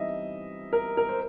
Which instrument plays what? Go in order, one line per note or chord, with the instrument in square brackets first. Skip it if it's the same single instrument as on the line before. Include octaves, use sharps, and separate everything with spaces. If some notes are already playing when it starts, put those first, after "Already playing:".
Already playing: [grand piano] E3 G3 C4 D#4 D#5 E5
A#4
A#4
C5